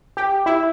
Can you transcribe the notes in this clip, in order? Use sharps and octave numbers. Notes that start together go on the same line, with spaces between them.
G4
E4